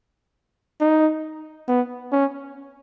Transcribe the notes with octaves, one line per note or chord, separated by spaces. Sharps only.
D#4
B3
C#4